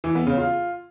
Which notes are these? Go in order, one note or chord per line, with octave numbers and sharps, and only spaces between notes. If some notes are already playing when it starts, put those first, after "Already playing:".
E3
B3
C#3
F4